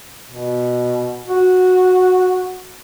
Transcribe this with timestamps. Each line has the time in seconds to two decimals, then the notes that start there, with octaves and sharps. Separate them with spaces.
0.31 B2
1.28 F#4